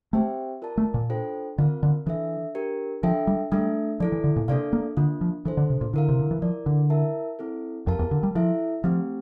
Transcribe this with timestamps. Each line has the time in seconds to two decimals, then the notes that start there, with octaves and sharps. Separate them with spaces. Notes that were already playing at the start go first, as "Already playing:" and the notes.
0.13 A3 C4 G4 C5 E5 G5
0.62 F4 A#4 D5 A5
0.77 A3
0.94 A#2
1.10 D4 F4 A4 C5 G5
1.58 D3 C4 F4 A#4 F5
1.83 D3
2.07 E3 D4 A4 E5
2.55 D4 G4 A#4
3.03 F3 D4 F4 A4 E5 G5
3.27 G3
3.52 G3 A3 D4 A4 E5
4.00 F3 E4 A4 D5
4.12 E3
4.24 D3
4.36 A#2
4.48 C3 A#3 D4 A4 D5 F5
4.73 A#3
4.97 D3 A#3 D4 F4
5.21 F3
5.45 E3 D4 A4 C5
5.57 D3
5.70 C3
5.81 A#2
5.93 D3 E4 A#4 F5
6.09 C3
6.19 D3
6.31 E3
6.42 F3 E4 A#4 D5
6.66 D3
6.90 E4 A#4 E5 A5
7.39 C4 E4 A4
7.87 F2 G4 A#4 F5 A5
7.99 E2
8.11 D3
8.23 G3
8.35 F3 E4 A4 E5
8.84 F3 A3 C4 G4